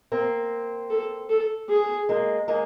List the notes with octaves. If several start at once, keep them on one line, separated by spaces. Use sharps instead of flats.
A#3 C4
A4
A4
G#4
G#3 A#3
G#3 A#3